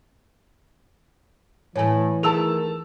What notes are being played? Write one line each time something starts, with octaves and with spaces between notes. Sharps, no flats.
A2 E3 A3 C#5 G#5
D#3 A3 G#4 A#4 A5 E6 F7